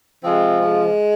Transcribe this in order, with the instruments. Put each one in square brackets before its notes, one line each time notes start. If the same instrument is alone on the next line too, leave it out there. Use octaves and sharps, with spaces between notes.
[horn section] C3 F3 G#3 C4
G#3